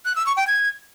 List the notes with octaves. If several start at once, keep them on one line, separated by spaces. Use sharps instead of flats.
F#6
E6
C#6
G5
G#6